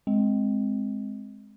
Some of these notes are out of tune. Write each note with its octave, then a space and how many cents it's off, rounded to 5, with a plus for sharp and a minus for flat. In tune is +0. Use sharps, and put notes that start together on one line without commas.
G#3 +10 C4 +0